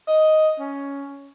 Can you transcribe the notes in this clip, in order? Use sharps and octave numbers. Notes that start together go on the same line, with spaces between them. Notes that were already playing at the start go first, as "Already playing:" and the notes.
D#5
C#4